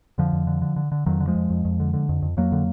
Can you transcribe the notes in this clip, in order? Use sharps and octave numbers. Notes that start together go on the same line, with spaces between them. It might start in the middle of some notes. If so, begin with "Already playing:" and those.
F2 D3 F3
F2
D3
D3
D3
D3
F2 D#3 F#3
D3
F3 G#3
F2
F2
F2
D3
D3
F2
F2
F2 F#3 A#3
D3